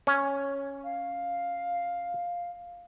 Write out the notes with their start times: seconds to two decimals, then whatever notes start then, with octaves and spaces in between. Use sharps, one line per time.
0.07 C#4
0.83 F5